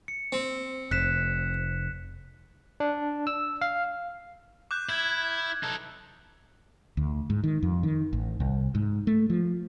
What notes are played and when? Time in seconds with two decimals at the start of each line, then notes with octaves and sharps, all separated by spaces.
0.08 C#7
0.32 C4
0.91 F1 F#6 B6 E7
2.80 D4
3.27 E6
3.61 F5
4.71 D6 F#6 G6
4.89 E4 G#6
5.63 D#4 A4
6.97 D2
7.30 G#2
7.44 D#3
7.63 F2
7.83 D#3
8.13 A1
8.40 C2
8.75 G#2
9.07 A3
9.30 F3